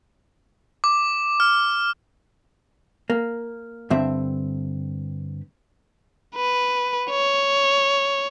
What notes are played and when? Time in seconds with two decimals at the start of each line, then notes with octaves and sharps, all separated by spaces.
0.84 D6
1.40 F6
3.10 A#3
3.90 G2 D3 C4 E5
6.36 B4
7.10 C#5